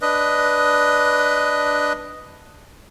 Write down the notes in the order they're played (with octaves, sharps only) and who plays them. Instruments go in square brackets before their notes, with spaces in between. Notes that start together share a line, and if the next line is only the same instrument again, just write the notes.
[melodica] D4 B4 D#5